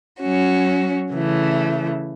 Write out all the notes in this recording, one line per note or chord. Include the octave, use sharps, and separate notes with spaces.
F#3 C#4 F#4
C#3 E3 A3